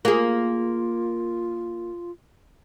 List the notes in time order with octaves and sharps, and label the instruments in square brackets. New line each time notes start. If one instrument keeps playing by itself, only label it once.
[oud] A#3 G#4 [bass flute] F4